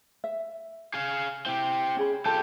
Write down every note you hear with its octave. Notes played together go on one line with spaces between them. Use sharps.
E5
G#4 F5
C4 E4 G4
C#4 G#4 B5
C2 F4 G4 A4 A5